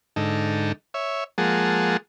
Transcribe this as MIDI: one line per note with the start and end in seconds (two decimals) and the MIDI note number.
0.16 0.72 44
0.16 0.72 50
0.16 0.72 63
0.16 0.72 69
0.94 1.24 73
0.94 1.24 76
1.38 1.97 53
1.38 1.97 56
1.38 1.97 58
1.38 1.97 68
1.38 1.97 78
1.38 1.97 81